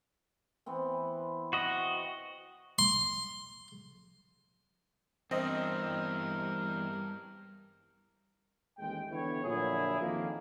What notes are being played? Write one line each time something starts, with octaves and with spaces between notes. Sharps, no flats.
E3 B3 C4
F#4 D#5
C6
E2 G2 C4 A#4 D#5
A1 D#2 G#3 G5
D3 E3 B3 E4 C#5
A#2 D3 F3 F#3 E4 G#4
F2 D#3 F3 A#3